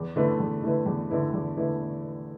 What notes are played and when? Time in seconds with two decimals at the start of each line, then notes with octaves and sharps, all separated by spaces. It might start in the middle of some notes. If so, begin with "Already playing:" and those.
Already playing: E2
0.16 D3 A3 E4 B4
0.40 E2
0.63 D3 A3 E4 B4
0.86 E2
1.10 D3 A3 E4 B4
1.33 E2
1.57 D3 A3 E4 B4